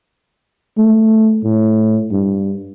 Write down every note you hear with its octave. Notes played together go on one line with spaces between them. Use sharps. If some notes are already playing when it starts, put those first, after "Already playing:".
A3
A2
G2